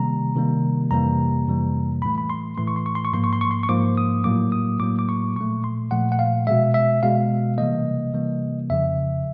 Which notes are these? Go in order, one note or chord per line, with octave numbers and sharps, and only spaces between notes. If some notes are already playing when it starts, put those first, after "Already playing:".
Already playing: C3 D#3 G3 A#3 A#5
C3 D#3 G3 A#3
F2 C3 E3 G3 A#3 A#5
F2 C3 E3 G3 A#3
A2 E3 A3 B5
B5
C6
A2 E3 A3 C6
C#6
C6
C#6
C6
C#6
G#2 F3 A#3 C6
C#6
C6
C#6
C6
C#6
G#2 F3 A#3 D6
D#6
A2 F#3 A#3 D6
D#6
A2 F#3 A#3 D6
D6
C#6
A#2 F3 A3 C#6
C6
A#2 F3 A3 F#5
F#5
F5
B2 G#3 E5
E5
B2 G#3 F5
C3 E3 G3 A#3 D#5
C3 E3 G3 A#3
F2 C#3 F3 E5